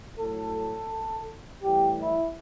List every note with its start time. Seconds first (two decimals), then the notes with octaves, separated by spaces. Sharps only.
0.19 A2 F#3 A4
1.62 A2 E3 G3 G4
1.98 E4